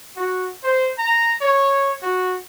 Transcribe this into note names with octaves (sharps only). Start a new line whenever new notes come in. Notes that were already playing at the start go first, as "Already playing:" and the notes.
F#4
C5
A#5
C#5
F#4